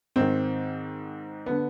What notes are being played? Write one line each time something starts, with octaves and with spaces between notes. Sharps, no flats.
G#2 D#3 C4
D3 B3